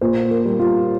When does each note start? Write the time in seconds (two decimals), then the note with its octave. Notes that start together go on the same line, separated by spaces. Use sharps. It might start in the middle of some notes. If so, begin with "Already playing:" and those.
0.01 A#2 C5
0.31 A#4
0.45 G3
0.59 F4